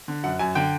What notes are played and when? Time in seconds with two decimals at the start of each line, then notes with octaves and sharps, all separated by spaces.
0.08 D3
0.24 F#2 F#5
0.39 F#2 G#5
0.55 D3 G5